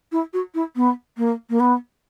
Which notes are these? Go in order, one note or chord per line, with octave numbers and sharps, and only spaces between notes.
E4
F#4
E4
B3
A#3
A#3
B3